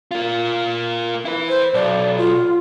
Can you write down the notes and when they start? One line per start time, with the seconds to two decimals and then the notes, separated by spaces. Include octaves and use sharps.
0.11 A#3 F4
1.25 E4 B4
1.49 C5
1.74 B1 D5
2.17 F4